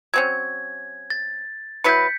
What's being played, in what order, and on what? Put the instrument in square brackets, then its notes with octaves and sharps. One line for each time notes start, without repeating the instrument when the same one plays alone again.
[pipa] F#3 C4 C#4 [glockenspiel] G#6
[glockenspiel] A6
[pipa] F#3 E4 B4 [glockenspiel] G6 B6 C#7